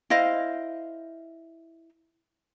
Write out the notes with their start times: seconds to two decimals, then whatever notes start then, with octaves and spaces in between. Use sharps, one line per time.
0.10 E4 C5 D#5 F5